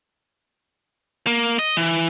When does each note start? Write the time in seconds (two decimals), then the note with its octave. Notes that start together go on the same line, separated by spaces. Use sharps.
1.27 A#3
1.59 D#5
1.77 E3